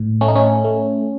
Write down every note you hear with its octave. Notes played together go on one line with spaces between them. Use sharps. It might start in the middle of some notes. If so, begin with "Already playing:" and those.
Already playing: A2
A3 C#4
D#4
C#4
A3